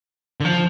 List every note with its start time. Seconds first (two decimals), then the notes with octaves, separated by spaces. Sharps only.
0.40 D3
0.45 F3